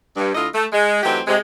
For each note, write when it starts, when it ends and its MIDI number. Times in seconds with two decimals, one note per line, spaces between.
0.17 0.31 43
0.35 0.47 38
0.35 0.47 50
0.35 0.47 64
0.35 0.47 65
0.35 0.47 75
0.54 0.66 57
0.73 1.03 56
1.03 1.21 52
1.03 1.21 54
1.03 1.21 57
1.03 1.21 60
1.03 1.21 63
1.03 1.21 67
1.27 1.36 48
1.27 1.36 56